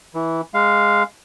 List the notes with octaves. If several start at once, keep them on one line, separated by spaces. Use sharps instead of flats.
E3
G#3 F5